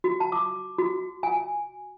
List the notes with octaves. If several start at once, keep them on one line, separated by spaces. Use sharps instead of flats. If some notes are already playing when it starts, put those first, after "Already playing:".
F#4
A5
D6
F#4
G#5